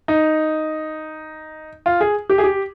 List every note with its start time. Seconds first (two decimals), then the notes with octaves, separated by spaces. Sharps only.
0.08 D#4
1.86 F4
2.01 G#4
2.30 G4
2.38 G#4
2.44 G4